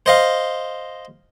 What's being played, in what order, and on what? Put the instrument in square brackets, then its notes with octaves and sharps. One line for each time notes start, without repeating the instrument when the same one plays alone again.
[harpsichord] C5 D#5 F5